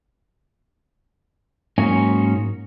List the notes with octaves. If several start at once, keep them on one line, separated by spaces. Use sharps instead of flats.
G#2 F#3 A#3 C#4 D#4 G#5